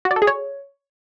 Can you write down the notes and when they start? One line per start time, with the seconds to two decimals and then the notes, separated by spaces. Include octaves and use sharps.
0.05 F#4
0.11 D5
0.16 A4
0.22 G#4
0.27 C#5